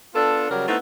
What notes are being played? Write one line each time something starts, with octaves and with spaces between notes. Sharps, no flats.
B3 D4 F4 A4
C#3 F#3 G3 G4 A#4
A3 B3 C4 D#4 E4